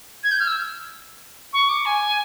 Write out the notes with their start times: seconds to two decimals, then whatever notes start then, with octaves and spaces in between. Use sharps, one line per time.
0.24 G#6
0.31 G6
0.40 F6
0.47 E6
1.53 C#6
1.69 D6
1.85 G#5